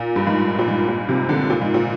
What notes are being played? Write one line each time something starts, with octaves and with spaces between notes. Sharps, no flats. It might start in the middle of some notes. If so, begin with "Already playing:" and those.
Already playing: A#2
G2
G#2
A#2
G#2
A#2
C3
D3
A#2
G#2
A#2